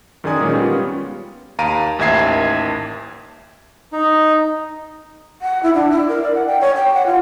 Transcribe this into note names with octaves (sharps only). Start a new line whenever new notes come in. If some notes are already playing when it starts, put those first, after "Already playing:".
F#2 D#3 G#4 D5 G#5 D#6
A#2 D#3 G#3 C#4
G3 B3 C#4 F4
D#2 F5 A#5 D7 D#7
A1 D#2 D#3 E5 G#6 C7
D#4
F#5
E4
D4
E4
A#4
D5
F#5
G5
C#5
G5
F#5
F4